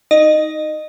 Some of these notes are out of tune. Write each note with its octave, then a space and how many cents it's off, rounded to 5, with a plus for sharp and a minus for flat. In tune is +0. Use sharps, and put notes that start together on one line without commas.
D#4 +10 D#5 -25